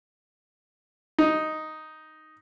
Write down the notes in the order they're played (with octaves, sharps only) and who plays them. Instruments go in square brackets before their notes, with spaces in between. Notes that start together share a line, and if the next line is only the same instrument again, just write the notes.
[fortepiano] D#4